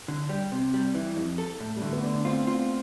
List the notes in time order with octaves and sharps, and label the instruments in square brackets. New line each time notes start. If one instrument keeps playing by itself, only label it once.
[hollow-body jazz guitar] D3
G3
C3
G3
E3
F2
A4
A2
[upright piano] G3
[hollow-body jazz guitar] D3 [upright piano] A3
[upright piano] B3
[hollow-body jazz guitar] D3
[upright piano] D4
[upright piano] C4 [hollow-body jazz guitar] F4
[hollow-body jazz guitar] F4